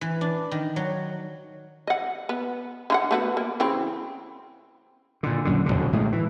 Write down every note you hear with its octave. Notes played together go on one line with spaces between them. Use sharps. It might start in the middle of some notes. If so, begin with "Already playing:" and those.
E3
D4
D#3
F#3
D#5 F#5
B3
D3 F4 F#5
A3 B3 F#4
A#3
C#3 E3 C4
A#2 D3
A#1 F#2 D3
D1 A#1 B2 D3
A2 G#3
E3